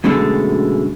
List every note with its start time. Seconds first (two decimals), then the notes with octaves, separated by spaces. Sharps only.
0.04 F#2 B2 D3 G#3 A3